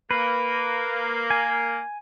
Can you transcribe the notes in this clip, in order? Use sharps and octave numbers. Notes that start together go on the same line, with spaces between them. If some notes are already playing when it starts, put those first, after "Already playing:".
A#3 B4
G#5